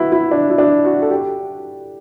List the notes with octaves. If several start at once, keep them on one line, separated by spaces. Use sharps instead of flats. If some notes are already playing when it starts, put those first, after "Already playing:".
Already playing: E4 F#4 B4
E4
D4
E4
D4
F#4
A4
G4